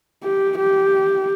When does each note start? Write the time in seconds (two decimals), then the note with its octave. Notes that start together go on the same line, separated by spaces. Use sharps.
0.24 G4
0.58 G4